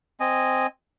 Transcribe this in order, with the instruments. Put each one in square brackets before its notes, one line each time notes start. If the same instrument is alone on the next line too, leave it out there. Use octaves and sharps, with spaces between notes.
[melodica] C4 D#5 G#5